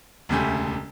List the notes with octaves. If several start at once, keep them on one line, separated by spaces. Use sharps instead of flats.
E1 D2 C#3 A3 G4 G#5